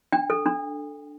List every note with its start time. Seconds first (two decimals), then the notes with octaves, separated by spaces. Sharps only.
0.12 D4 G5
0.30 A4
0.46 D4